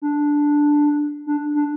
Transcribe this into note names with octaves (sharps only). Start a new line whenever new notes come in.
D4
D4
D4